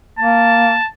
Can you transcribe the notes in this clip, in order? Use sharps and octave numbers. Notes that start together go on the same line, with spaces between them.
A#3 A5